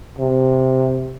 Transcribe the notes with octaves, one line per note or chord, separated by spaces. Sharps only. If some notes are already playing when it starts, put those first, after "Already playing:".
C3